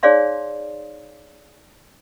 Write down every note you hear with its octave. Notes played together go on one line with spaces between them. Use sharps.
D#4 G#4 C#5 D5 F5 C6